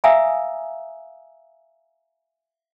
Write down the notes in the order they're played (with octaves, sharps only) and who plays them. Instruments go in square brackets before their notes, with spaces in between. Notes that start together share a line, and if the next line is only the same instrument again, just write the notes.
[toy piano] E5 F5 G#5 A#5 D#6 E6